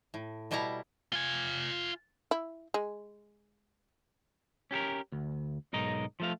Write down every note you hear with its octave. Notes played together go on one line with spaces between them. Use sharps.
A2
B2 G3 E4 A5 A#5
F4 G#5
E4
G#3
C#4 G4 A4 A#4
D2
B1 G#2 D#4 A#4 D#5
F3 A3 F5